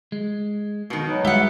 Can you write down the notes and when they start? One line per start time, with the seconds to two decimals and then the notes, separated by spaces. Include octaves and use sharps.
0.12 G#3
0.90 F2 B2 D#3
1.07 F#3 D#4 B4
1.25 G3 G#3 G4 E5 F#5